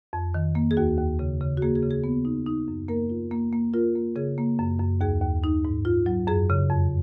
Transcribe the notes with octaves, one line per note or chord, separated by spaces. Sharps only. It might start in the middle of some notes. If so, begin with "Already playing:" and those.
F2
D#3
A#3
G#4
D#2 F#4
D#2
C#3
C#3
F#4
A#3 G#4
G#4
C#3
G#4
B3
D#4
D#4
F#2
A#3 A#4
F4
A#3
A#3
F4 A#4
A#3
C#3 G#4
A#3
F#2
F#2
D#2 G#4
D#2
D#4
G#2
F4
F#3
F#2 G#4
C#3
F2